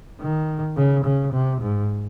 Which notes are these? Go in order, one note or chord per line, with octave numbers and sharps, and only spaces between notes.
D#3
C#3
C#3
C3
G#2